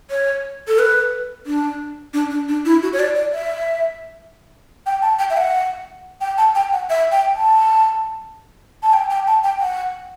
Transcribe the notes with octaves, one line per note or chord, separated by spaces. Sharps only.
C#5
A4
B4
D4
D4
D4
D4
E4
F#4
C#5
D5
D5
E5
G5
A5
G5
E5
F#5
G5
A5
G5
F#5
E5
G5
A5
A5
G5
G5
A5
G5
F#5